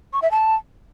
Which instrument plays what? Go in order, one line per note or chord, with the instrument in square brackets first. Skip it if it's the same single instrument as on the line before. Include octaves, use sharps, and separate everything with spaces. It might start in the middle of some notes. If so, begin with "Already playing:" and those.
[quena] C#6
E5
A5